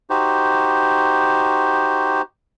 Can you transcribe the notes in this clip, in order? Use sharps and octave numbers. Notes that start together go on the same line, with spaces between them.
D#4 F#4 G4 C5